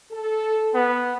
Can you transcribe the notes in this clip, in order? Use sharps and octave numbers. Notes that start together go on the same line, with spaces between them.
A4
B3